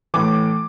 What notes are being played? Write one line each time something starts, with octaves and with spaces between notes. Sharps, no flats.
A2 E3 D6